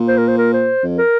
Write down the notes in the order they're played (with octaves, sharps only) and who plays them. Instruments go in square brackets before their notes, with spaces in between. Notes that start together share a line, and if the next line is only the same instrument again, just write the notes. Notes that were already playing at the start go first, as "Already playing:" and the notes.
Already playing: [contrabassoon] A#2
[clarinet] C5
A#4
C5
A#4
C5
[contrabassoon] F2
[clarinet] A#4